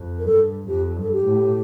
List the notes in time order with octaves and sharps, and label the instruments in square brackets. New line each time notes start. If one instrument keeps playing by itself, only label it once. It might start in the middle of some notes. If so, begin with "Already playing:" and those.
Already playing: [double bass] F2
[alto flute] A#4
[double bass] G2 [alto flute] A4
[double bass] F2 [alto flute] G4
[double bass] G2
[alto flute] A4
G4
[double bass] A2